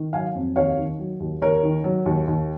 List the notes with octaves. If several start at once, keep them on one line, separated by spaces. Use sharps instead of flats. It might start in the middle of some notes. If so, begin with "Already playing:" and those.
Already playing: D#3
F#3 F5 G#5
F2
D#2 C#5 F5
D#3
F#3
D#2
D#2 A#4 C#5
D#3
F#3
D#2
D#2